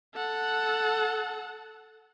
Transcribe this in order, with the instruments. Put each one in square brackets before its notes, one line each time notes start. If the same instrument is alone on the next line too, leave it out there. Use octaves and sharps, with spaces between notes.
[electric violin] A4 F#5